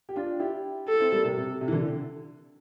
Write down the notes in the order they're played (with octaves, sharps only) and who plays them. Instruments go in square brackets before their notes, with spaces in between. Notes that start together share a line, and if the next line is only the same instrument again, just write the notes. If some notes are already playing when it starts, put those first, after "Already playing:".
[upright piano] G4
D4 F4
E4 G4
[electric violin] A4
[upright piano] C4 E4
G3 A#3
C3
C3
C3
E3
D3